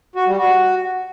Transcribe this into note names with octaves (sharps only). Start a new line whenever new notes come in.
F#4
G3
F#4